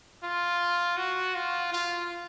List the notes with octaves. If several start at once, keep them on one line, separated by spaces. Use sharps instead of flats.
F4
F#4
F4
F4